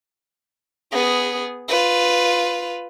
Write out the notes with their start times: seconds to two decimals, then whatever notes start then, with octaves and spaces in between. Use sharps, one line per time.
0.92 B3 G#4
1.68 F4 B4